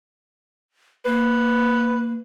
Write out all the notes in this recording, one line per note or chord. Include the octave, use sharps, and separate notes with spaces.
A#3 B4